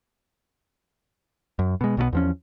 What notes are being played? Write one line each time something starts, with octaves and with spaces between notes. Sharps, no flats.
F#2
B2 G#3
B1 B2 E3 B3
E2 F3 C#4